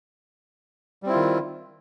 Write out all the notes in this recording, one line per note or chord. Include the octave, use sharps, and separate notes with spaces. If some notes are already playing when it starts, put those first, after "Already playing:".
D#3 G3 C4 E4 F4